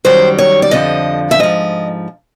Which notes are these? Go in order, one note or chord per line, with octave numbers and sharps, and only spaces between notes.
F#2 D#3 G3 C5
C#5
D5
F2 D3 F3 D#5
E5
G#2 F3 D#5